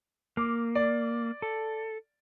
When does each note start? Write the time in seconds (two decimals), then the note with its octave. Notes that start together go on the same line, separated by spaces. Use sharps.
0.37 A#3 D6
0.75 D5
1.42 A4